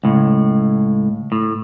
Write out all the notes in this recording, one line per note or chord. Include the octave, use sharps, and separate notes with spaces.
C#2 A2
A2